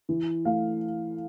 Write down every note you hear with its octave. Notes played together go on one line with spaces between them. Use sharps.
E3
A3 F5